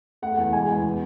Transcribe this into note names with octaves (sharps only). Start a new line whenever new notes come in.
A3 F#5
E2
G#3 G#5
E2
B3